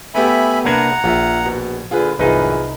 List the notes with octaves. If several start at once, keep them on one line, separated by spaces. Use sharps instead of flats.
A3 B3 G4 E5 G#5 B5
C2 A#3 D4 B4 F#5 A#5 G#6
A#1 F4 E5
B2
A#2 D3 F4 G#4 B4
C2 F#2 A2 E3 D#4 F4 G#4 B4